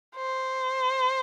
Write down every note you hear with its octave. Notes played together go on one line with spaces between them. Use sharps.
C5